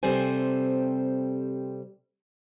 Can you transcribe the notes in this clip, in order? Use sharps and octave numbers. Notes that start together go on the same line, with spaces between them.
C3 G3 C4 A4 C5 G#5